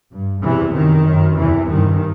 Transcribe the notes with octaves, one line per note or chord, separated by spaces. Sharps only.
G2
E2 C3 E3
F#2 D#3
F#2
E2 C3 E3
G2 D#3